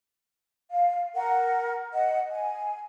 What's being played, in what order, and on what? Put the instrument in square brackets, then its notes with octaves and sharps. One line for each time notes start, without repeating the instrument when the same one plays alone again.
[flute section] F5
A#4 F#5
D#5 F#5
G#5